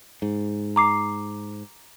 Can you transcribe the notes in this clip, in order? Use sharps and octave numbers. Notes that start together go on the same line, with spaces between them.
G#2
A#5 D6 C7